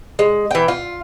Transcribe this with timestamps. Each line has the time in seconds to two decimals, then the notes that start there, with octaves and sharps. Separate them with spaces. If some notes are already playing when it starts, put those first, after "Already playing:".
0.19 G#3
0.51 E3 G5
0.68 F4